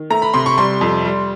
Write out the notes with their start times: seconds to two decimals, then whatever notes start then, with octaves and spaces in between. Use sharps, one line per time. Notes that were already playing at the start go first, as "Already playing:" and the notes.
Already playing: D#3
0.10 A3 A#5
0.22 B5
0.34 C3 C6
0.46 C#6
0.58 G3 C6
0.81 F2
1.05 G3